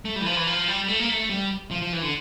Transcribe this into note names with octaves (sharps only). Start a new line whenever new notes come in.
A3
G3
E3
F3
E3
F3
G3
G3
A3
A#3
A3
G3
F3
F3
E3
D3